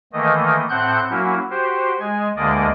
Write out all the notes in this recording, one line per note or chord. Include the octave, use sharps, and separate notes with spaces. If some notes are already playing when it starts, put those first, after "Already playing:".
D#3 E3 A3 A#3 D#5
A2 C4 F#5 F#6 G6
F#3 A#3 C#4 E4 F#4
F#4 G4 C5
G#3 G#5
D2 D3 G#3 A#3 D5 D#5